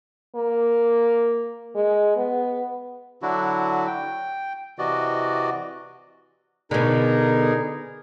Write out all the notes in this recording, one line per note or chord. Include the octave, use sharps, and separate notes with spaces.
A#3
G#3
B3
D3 F#3 D4 E4 F#4
G5
C3 E3 F#4 D5 D#5
B2 D3 D#4 G#4 A#4